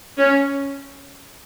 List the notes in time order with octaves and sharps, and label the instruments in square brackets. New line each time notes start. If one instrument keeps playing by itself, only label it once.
[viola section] C#4